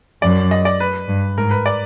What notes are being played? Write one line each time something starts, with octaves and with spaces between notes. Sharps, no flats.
F#2 D5
D#5
D5
B4
G2
G#2 A#4
B4
D5